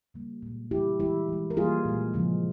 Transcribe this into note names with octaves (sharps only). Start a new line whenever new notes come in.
C#3 G3 A#3
A#2 G#3
C#3 E3 G3 E4 G4
E3 G#3 E4 G4
E3 G#3
A#4
E3 G3 A#3 F4 G#4
A#2 G#3
C#3 F3 G#3